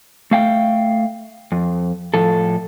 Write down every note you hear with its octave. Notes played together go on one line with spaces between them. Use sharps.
A3 F5 G5
F2
A2 F3 A4